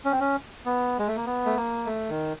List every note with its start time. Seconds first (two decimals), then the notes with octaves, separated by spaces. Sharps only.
0.05 C#4
0.12 C4
0.20 C#4
0.66 B3
0.99 G#3
1.08 A3
1.16 A#3
1.26 B3
1.46 A3
1.56 A#3
1.86 A3
2.09 D#3